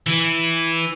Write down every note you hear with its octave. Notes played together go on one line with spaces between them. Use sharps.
E3